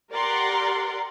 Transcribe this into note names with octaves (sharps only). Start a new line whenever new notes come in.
G4 A#4 D5 F#5 A#5 C6